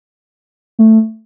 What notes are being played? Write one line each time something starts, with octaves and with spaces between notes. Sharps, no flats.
A3